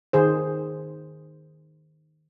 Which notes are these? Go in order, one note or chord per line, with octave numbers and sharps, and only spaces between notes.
D#3 G#4 C5